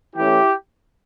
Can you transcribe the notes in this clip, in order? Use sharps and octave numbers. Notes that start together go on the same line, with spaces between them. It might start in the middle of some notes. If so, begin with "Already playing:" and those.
E3 A3 C#4 E4 G4